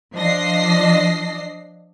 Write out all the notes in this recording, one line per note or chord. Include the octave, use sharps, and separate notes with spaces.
F3 D4 D#5 A#6 C7